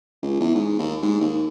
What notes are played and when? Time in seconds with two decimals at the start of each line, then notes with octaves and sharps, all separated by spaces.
0.22 C#2
0.40 E2
0.55 G#2
0.79 D#2
1.02 G#2
1.21 D#2